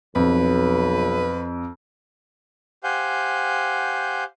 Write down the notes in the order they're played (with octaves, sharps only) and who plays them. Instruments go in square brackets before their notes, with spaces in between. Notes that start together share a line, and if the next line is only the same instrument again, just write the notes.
[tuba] B1 [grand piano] F2 [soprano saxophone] B4
[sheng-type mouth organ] G4 C5 F5 F#5 G#5 G6